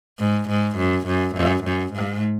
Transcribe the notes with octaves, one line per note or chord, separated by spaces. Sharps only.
G#2
G#2
F#2
F#2
F#2
F#2
G#2